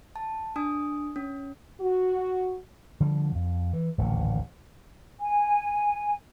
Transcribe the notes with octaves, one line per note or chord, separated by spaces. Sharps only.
A5
D4 G#5 D#6
C#4
F#4
D3 F3 G3
F2
E3
D1 A1 D#2 A#2
G#5